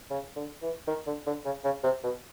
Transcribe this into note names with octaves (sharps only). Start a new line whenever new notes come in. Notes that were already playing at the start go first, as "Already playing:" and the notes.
C#3
D3
E3
D#3
D3
D3
C#3
C#3
C3
B2